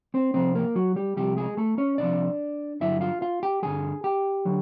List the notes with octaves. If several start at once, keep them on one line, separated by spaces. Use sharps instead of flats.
C4 C5
C2 C3 F3 C4 C5
A#3 A#4
F#3 F#4
G3 G4
C2 C3 F3 G3 G4
G#3 G#4
A3 A4
C#4 C#5
C2 C3 F3 D4 D5
G2 D3 F#3 E4 E5
F4 F5
F4 F5
G4 G5
G2 D3 F#3 G#4 G#5
G4 G5
D3 F#3